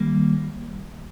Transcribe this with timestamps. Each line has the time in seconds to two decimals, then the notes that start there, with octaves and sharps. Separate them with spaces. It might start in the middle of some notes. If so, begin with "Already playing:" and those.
Already playing: D#3 G3 A#3